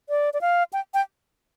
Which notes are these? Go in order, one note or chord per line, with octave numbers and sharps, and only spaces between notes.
D5
D5
F5
G5
G5